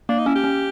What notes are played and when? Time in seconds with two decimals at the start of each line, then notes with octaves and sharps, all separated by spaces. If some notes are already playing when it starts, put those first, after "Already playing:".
0.09 A#3 D4
0.18 D#4
0.26 C#4 E4
0.35 G4
0.44 C#4